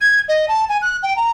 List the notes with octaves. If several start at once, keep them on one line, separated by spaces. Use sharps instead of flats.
G#6
D#5
A5
G#5
F#6
G5
A#5